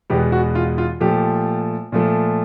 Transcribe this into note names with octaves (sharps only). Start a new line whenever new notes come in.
E2 B2 G#3 B3 G4
F#4
F4
F4
A#2 F3 A3 G4
A#2 F3 A3